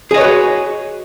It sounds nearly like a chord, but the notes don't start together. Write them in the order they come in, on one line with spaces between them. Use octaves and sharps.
G#4 D#5 C#5 B4 F#4